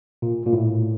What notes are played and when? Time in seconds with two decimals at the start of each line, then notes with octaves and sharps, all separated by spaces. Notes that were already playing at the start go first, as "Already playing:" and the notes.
0.22 A#2
0.46 A#2
0.53 A2